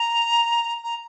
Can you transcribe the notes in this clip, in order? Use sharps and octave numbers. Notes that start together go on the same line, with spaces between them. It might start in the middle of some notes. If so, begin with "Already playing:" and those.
Already playing: A#5
A#5